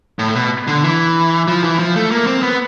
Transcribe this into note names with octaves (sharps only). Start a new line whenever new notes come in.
A2
B2
D3
E3
F3
E3
F3
A3
A#3
C4
B3